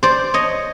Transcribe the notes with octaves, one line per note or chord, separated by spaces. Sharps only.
C5 D5
C#5 D#5